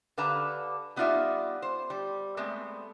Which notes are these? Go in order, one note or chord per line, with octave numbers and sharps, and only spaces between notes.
D3 G4 B4 F5 A5 A#5
G3 B3 D#4 F4 D5 E5
C5
G3
G#3 A3 B3 C4